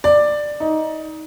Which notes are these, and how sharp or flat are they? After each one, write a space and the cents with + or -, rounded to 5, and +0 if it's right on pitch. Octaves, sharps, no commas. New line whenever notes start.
D5 +10
D#4 +15